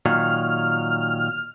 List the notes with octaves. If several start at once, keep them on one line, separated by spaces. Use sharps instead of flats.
A#2 D#3 F#3 F6